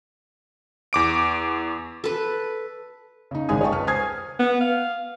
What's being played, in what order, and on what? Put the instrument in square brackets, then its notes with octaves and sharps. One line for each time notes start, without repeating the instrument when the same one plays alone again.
[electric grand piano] E2 D6 D7
[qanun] A4 B4
[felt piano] C#3 D#4
G#1 C#3 G#3 G#4 G#5 D#6
C#5 D#5 F5 G5 A5 C#6
C#2 B4 F6
C5 G#5 D#6 F6 G#6 C7
[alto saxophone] B3
F5